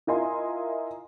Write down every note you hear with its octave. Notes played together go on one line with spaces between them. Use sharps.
E4 F4 A#4 D#5 G#5 C6